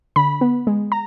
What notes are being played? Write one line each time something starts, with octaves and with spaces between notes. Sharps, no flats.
D3 B5
B3
G#3
A#5